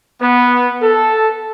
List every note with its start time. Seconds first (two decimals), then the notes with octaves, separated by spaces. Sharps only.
0.20 B3
0.81 A4